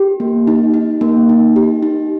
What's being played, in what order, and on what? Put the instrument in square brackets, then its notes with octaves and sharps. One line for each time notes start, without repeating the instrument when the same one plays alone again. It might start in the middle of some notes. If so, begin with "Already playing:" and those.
Already playing: [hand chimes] G4
A#3
D#4
D#4
A#3
D#4
G4
D#4